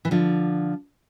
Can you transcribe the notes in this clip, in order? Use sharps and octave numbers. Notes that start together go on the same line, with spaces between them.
E3
D3 F3